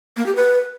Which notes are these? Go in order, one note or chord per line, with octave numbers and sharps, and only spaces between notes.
A#3
G4
B4